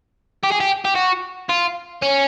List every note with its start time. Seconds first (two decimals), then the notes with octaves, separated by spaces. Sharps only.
0.43 G4
0.51 G#4
0.60 G4
0.85 G4
0.96 F#4
1.49 F4
2.02 C#4